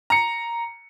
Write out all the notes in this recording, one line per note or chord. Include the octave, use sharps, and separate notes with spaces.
A#5 C#7